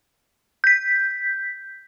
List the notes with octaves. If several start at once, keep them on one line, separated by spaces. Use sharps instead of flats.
G6 B6